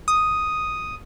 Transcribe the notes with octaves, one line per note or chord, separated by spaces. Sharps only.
D#6